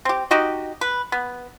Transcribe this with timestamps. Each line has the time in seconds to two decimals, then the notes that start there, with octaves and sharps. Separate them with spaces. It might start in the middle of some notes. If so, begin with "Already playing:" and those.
0.05 C4 G4
0.31 D#4 F#4 G4 D#5
0.81 B4
1.12 B3